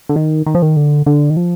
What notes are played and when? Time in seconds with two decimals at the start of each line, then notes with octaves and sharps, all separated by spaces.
0.09 D3
0.16 D#3
0.46 D#3
0.55 F3
0.62 D#3
0.77 D3
1.06 D3
1.30 D#3
1.37 F3